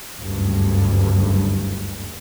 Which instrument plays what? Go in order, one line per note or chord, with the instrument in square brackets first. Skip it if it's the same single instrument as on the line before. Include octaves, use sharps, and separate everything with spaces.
[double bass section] F#1 D2 G2